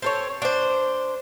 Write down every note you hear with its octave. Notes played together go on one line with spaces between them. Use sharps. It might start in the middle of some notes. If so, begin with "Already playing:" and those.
C4 A4 C#5
D4 C5